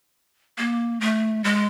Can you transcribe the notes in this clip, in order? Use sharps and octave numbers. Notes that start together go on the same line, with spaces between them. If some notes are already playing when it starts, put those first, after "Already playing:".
A#3
A3
G#3